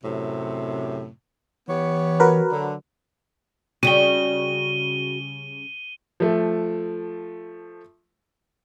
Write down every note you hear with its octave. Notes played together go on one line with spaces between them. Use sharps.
F#2 A2 C3
E3 B3 G4 C#5
F#4 A#4 B4
D3 F#3
C#3 G3 F#4 G5 D#7 G7
F3 A3